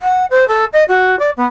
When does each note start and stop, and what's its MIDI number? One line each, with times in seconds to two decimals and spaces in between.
0.02 0.26 78
0.31 0.48 72
0.48 0.65 69
0.73 0.84 75
0.88 1.19 66
1.19 1.31 74
1.37 1.46 59